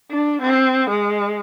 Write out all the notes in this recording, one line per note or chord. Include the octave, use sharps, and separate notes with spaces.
D4
C4
G#3